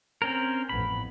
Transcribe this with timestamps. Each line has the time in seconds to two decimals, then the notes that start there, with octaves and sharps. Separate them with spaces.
0.22 C4 C#4 A#4
0.69 A1 F2 B3 B5